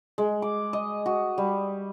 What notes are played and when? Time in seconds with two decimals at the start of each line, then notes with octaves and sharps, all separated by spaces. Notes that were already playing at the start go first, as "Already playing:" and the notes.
0.18 G#3
0.42 D6
0.73 D#5
1.06 F#4
1.38 G3